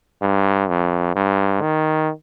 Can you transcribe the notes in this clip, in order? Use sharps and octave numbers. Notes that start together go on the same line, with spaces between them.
G2
F2
G2
D#3